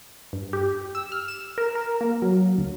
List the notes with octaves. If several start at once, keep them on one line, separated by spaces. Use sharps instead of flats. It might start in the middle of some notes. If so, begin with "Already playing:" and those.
G2
G4
E6
F6
E7
A#4
A#4
A#3
F#3
D2